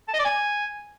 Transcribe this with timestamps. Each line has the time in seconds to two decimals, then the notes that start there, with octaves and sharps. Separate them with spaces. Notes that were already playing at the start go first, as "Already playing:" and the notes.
0.08 A5
0.14 D#5
0.19 D5
0.25 G#5